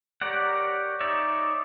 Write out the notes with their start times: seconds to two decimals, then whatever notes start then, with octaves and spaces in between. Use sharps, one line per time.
0.21 G4 A#4 C#5 D5 F#5
1.00 D#4 C#5 D5 E5